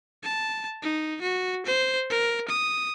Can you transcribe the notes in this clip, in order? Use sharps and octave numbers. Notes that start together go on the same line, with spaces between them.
A5
D#4
F#4
C5
A#4
D#6